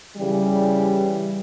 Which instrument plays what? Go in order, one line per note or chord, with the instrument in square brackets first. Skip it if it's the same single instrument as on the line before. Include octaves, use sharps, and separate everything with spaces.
[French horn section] C#3 E3 G3